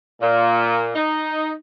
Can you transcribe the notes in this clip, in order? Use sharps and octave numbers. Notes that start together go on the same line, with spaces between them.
A#2
D#4